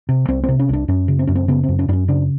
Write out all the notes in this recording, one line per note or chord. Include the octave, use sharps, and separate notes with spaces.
C3
C2 C4
C3 C4
C#4
C2 D4
F#2 C#4
C#3
C4
F#2 C#4
C4
C#3 B3
C4
F#2
C#4
F#2 C#4 D4
C#3 D4